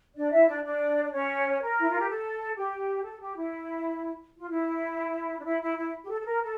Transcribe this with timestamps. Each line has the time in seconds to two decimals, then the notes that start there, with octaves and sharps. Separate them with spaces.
0.16 D4 D5
0.32 E4 E5
0.48 D4 D5
0.63 D4 D5
1.04 D5
1.12 C#4 C#5
1.49 C#5
1.61 A#4
1.78 E4
1.88 F4
1.98 G4
2.08 A4
2.56 G4
3.04 A4
3.21 G4
3.37 E4
4.38 F4
4.49 E4
5.39 D4
5.45 E4
5.61 E4
5.77 E4
6.04 G4
6.09 A4
6.20 A4
6.25 A#4
6.42 A4